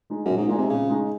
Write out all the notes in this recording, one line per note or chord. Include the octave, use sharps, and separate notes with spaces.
G#3 D#4 G#4
F#2
A#2
G#2
A#2 G#3 D#4 G#4
C3
A#2 C#3
G#3 D#4 G#4